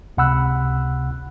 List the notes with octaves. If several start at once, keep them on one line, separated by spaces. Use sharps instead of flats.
C#2 C3 F#5 B5 E6 F#6